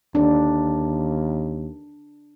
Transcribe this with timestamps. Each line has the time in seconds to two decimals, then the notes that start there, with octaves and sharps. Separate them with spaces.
0.15 D#2 D4